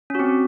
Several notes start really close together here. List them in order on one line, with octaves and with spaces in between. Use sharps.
C#4 F#4 C4